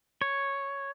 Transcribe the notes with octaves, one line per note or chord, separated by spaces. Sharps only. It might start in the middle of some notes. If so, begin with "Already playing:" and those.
C#5